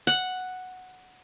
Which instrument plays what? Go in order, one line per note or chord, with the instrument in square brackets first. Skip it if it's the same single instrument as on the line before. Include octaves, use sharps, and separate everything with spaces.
[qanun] F#5